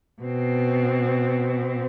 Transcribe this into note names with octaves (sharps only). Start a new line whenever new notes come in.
B2 C4